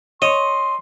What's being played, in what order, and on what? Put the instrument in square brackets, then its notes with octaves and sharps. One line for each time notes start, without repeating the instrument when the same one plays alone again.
[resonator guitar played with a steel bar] C#5 [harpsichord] D#5 [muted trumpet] C6